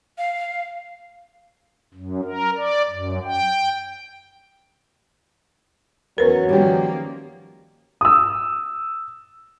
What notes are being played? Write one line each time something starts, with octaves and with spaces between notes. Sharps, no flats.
F5
F#2
A#4
D5
F#2
G5
E2 F#3 C#4 A#4 B4
D#3 F3 G3 A#3 C#4 G4
D#6 E6